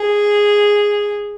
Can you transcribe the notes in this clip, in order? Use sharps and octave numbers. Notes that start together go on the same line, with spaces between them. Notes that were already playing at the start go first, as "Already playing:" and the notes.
Already playing: G#4